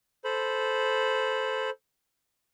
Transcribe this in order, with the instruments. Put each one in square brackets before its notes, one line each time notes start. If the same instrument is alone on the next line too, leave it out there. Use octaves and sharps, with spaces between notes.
[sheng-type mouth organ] A4 C5 B5